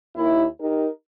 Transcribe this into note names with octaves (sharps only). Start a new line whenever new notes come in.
D#2 E4
D#4 G4 A#4